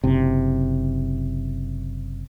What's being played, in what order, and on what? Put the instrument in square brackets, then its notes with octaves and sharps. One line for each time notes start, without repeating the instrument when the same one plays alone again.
[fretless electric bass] F#1 C3